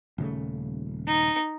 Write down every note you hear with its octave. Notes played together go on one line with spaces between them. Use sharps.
D#1 C#3 A3
D#4